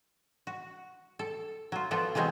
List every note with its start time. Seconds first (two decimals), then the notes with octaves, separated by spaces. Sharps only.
0.47 F#4
1.19 A4
1.72 F#3 F4
1.91 F3 B3 F4 A4 D5
2.15 E3 F#3 G#3 B3 C4